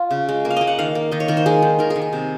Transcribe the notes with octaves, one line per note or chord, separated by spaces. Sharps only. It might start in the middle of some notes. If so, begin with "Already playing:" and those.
Already playing: F4
C#3
G#3
A#3
F5
A#3 D#5
F#5
D#3 F5
A#3
D#3 D#5
C#5
D#3 A#4
C5
G#3 G#4
D#3
D#3 A#4
G#4
D#3
G#4
C3